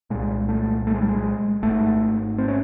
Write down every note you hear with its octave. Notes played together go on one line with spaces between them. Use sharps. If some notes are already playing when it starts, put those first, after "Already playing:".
C2 A#2 G#3
A3
A3
G#3
G3
G#3
G#1 G#2 A3
C4
C#4